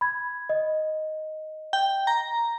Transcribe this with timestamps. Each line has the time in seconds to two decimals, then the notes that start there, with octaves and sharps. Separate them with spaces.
0.01 B5 G#6
0.49 D#5
1.73 G5
2.07 A#5